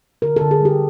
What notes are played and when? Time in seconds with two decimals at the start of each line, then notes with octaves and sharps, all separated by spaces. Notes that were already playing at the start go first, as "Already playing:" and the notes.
0.22 D3 A#4
0.36 D3 A4
0.51 G#4
0.60 G3 G4